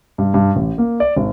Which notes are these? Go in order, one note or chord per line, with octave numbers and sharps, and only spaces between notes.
G2
G2
A1
A#3
D5
G#1